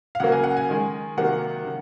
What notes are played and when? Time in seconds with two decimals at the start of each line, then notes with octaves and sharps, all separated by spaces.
0.15 F5
0.20 C#3 F#3 A#3 F#5
0.32 G#5
0.44 F#5
0.57 G#5
0.69 D#3 G#3
1.17 C3 D#3 F#3 A#3 F#5
1.65 C#3